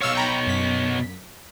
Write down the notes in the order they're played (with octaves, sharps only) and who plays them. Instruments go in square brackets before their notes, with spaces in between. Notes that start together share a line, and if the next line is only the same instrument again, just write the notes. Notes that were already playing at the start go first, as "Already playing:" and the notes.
[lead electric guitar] B2 C#5 [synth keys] F5 E6 F6
[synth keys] G5 A#5 B5
F#2 B6